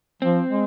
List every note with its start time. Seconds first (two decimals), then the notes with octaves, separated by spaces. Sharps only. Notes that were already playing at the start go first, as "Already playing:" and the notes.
0.22 F3 C4
0.49 G#3